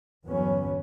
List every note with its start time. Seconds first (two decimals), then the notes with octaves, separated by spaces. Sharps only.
0.24 E2 G2 D3 F#3 B3 C#4